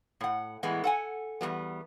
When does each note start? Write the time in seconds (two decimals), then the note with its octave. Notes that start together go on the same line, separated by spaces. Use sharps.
0.21 A2 F#5
0.63 A2 E3 G#3 B3
0.84 A4 F#5 G#5
1.41 E2 G#2 G3 B3